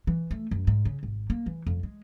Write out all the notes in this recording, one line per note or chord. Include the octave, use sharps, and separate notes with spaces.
E3
A3
F#2
G#2
C#3
G#1
A#3
E3
F2
G#3